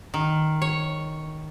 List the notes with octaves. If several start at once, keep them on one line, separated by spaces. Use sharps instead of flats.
D#3
C#5